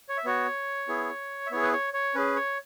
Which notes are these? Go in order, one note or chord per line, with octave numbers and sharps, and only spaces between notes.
C#5
E5
B3 F#4 C#5
B3 E4 G#4
E5
B3 E4 G#4 C#5
B4
C#5
C#5
C#4 G#4 B4
C#5